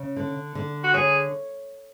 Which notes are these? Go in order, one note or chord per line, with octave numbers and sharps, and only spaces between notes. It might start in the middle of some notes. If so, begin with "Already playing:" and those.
Already playing: C#3
D3
D3
F#4
G#4 C#5